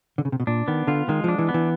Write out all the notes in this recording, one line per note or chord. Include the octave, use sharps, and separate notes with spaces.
D3
C#3
C3
B2
A#2 D4
D#3 B3
D3 F4
D#3 G#3
F3 D4
E3
B3
E3